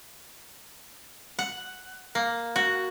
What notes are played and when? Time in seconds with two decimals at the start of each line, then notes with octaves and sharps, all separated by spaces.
1.39 F#5
2.15 A#3
2.56 F#4